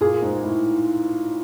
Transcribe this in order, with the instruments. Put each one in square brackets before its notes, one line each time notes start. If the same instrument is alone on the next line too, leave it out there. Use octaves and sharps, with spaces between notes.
[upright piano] A#2 [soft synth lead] G#4
[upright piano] G#2
A2